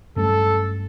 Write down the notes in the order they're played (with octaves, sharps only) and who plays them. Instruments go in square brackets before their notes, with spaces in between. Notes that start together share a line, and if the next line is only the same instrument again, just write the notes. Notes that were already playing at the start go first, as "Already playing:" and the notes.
[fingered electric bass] G2 F#3 A3 C#4 [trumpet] A4